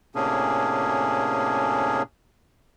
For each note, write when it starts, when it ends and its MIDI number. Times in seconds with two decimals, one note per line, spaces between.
0.15 2.02 45
0.15 2.02 48
0.15 2.02 58
0.15 2.02 61
0.15 2.02 62
0.15 2.02 68